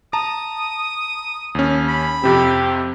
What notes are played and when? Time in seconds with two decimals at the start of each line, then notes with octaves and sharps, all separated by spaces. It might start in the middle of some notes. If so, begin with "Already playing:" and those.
0.13 A5 A#5 D#6
1.55 D#2 C#4
1.88 B5
2.24 F2 C3 C4 G4